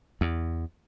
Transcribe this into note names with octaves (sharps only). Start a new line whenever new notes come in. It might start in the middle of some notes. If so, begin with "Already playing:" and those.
E2